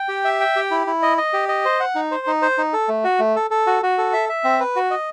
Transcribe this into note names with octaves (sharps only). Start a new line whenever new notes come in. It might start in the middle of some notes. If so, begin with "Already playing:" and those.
Already playing: G5
G4
E5
G5
G4
E4
E4
D#5
D#5
G4
D#5
C5
F#5
D#4
C5
D#4
C5
D#4
A4
A3
F#4
A3
A4
A4
F#4
F#4
A4
E5
E5
C4
B4
F#4
D#5